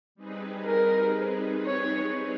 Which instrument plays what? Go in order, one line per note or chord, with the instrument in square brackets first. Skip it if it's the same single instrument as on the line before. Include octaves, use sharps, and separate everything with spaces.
[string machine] G3 C4 D#4 G#4 B4
[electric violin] A#4
C#5